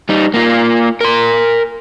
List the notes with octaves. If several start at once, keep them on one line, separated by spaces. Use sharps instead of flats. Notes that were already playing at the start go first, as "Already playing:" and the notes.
G3 D#4
A#3 F4
A#4 C6